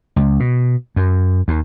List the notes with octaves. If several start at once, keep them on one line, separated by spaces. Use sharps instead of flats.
C#2
B2
F#2
D#2